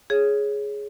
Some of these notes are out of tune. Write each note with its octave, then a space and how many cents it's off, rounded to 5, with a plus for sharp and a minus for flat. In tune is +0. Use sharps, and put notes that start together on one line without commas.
G#4 +5 C#5 +0